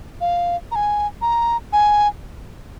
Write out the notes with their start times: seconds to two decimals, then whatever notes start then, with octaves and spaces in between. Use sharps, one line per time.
0.21 F5
0.71 A#5
0.75 G#5
1.22 A#5
1.73 G#5